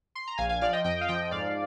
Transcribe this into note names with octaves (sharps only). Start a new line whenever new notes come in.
C6
A#5
A#1 F5 G#5
F5 G#5
F3 D5 F5
D#5 G5
F2 D#5 G5
F5
F3 D#5 G5
G#2 D5 F5